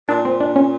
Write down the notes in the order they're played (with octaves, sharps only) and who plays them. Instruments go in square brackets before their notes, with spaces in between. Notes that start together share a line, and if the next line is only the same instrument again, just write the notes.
[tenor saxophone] A#2 [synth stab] D4
[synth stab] C4
D4
C#4